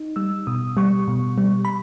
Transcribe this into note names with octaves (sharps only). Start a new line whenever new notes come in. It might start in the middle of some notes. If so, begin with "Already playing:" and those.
Already playing: D#4
G3 E6
B2 D#6
G3 C#6
B2
G3
B5